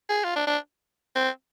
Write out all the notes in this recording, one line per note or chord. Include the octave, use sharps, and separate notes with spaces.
G#4
F4
D4
D4
C4